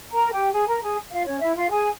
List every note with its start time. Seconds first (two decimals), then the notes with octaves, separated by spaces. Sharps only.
0.12 A#4 A#5
0.32 G4 G5
0.52 G#4 G#5
0.67 A#4 A#5
0.82 G#4 G#5
1.12 F4 F5
1.26 C#4 C#5
1.41 E4 E5
1.55 F4 F5
1.71 G#4 G#5